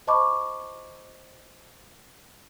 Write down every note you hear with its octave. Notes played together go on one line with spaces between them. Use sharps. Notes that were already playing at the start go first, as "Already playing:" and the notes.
C5 D#5 A5 B5 C#6 D6